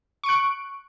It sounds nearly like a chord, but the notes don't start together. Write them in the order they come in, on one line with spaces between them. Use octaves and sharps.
C#6 D7 F#6